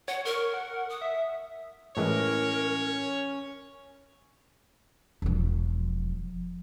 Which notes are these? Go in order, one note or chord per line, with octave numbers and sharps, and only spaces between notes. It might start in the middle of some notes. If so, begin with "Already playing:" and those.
C#5 F#5
A#4 C#6
F#5
D#6
E5
A2 E3 G#3 C#4 A#4 C#5
E1 F3